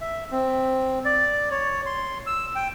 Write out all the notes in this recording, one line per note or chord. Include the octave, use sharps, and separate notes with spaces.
E5
C4
D5
C#5
C6
E6
G5